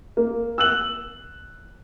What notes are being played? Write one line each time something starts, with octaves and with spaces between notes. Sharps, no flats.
A#3
E6 F#6 F#7